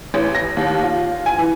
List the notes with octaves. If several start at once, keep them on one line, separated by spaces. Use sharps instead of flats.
A1
A#6
D#2
F4
G#5
E3